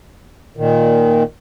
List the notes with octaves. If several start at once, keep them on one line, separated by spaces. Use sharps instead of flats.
A#2 D#3